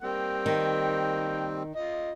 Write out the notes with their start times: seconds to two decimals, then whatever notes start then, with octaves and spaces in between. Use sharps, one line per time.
0.03 G3 A#3 C4 G5
0.46 D#3
1.76 F4 D#5